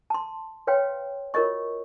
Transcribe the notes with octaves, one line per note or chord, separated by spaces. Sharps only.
A5 C6
B4 C#5 F5 G5 C6
F4 F#4 A#4 C#5 D#5 C#6